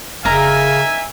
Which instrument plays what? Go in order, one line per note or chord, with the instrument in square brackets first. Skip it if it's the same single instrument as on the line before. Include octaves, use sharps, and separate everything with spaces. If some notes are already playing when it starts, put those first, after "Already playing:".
[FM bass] F1 [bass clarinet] C#3 [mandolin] D#4 A#4 A#5 [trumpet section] E5 G#5